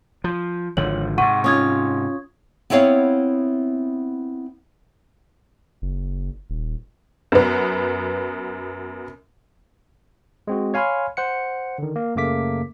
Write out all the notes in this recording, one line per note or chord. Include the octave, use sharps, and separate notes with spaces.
F3
G#1 D3 F3 C#5 F#7
G#2 C3 F#5 C#6 D#7
C#4 F4 C#6 D#6 G#6
B3 C4 E4 C#5 F5
F#1
D#1
F#2 B3
G#3 C4 F#4
C#5 F5 G#5 B5 C6 F6
C5 F#5 C#7
D3 D#3
A#3
F#2 C#3 A3 A#3 D6 B6